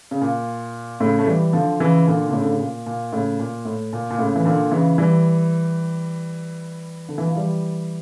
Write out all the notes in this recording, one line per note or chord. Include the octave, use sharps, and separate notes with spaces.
C#3
A#2
A2 C#3
A3
E3 G3
D3 F3
C#3 E3
A#2 D3
D3
A2 C#3
D3
C#3
A#2
A#2
A2 C#3
A#2
A2
A#2
A#2
A2 C#3
E3
A#2 D3
C#3 E3
E3 G3
D3
E3
F3
E3 G3